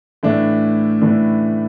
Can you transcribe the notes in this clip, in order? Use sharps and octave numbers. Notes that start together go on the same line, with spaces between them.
A2 E3 A3 D4
A2 E3 A3 D4